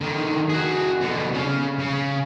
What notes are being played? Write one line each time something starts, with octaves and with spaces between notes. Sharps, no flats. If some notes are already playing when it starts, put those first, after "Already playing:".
D3 D#3
F#4 G#4
B2 D3
C#3 C#4
C#3